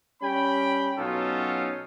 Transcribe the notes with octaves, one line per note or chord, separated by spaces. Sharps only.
G3 C#4 G5 B5
B2 F#3 C#4 D#4 F4 A4